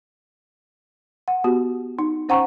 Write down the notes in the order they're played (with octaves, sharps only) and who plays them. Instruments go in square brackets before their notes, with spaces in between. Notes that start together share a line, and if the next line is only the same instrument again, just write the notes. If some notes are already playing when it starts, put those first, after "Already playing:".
[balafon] F#5
B3 F#4 G4
D#4
C#4 C5 F#5 G5 A#5 C#6